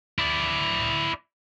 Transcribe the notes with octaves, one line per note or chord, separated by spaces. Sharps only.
E4 D5